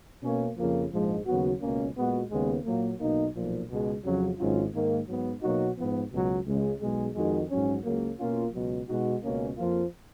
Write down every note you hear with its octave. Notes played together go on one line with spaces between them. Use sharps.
B2 A#3 C#4
F2 C#3 F3 A#3 F4
A#1 G#2 F3 G#3
D#2 C#3 F#3 B3 F#4
C#2 B2 A#3 C#4
A#2 G#3 B3 F#4
D#2 C#3 G#3 B3
A#2 F#3 A#3
B1 B2 A#3 D#4
B1 A#2 F3
C#2 B2 G#3
F2 C#3 F#3 C#4
G#1 G#2 F#3 C#4 F4
G#2 D#3 A#3
G#2 F#3 B3
B2 F#3 A#3 D#4 F#4
G#2 F3 B3
C#2 B2 F#3
C#2 C#3 G#3
B1 B2 G#3
F2 D#3 G#3 D#4 F#4
A#1 G#2 F#3 C#4
C#2 C#3 F#3 A#3
B2 A#3 C#4 F4
C#2 B2 F#3
B2 G#3 D#4 F#4
C#2 B2 A#3 C#4
F2 F3 A#3 F4